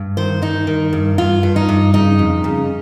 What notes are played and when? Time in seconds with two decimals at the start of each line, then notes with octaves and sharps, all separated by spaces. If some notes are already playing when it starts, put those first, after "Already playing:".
Already playing: G2
0.17 D#3 C5
0.42 G2 D#4
0.67 D#3
0.93 G2
1.18 G2 F4
1.43 G2
1.56 D#4
1.69 G2
1.94 C#3 D#4
2.19 F2
2.44 C#3